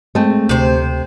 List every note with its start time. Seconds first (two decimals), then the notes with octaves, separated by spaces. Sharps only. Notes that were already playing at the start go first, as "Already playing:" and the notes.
0.15 G#3 A3 C4
0.49 D2 C3 C5